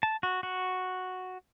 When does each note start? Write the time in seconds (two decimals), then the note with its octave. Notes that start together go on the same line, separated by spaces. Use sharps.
0.03 A5
0.23 F#4
0.43 F#4